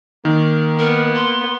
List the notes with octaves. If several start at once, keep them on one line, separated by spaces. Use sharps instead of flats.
D#3 A#3
B3 A#4
C6